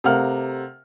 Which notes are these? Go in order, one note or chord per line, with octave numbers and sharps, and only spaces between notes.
C3 A3 A#4 F5 F#5 F6